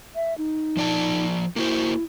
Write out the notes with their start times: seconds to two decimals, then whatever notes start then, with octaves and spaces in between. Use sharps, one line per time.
0.15 E5
0.38 D#4
0.77 F3 D5 A5
1.56 A#3 E4 F#4 C5